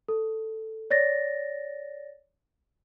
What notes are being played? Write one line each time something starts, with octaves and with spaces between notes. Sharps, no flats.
A4
C#5 D5 A6 A#6